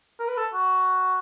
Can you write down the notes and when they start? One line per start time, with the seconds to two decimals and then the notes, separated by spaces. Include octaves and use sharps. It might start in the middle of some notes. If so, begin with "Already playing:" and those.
0.20 A#4
0.28 B4
0.38 A4
0.54 F#4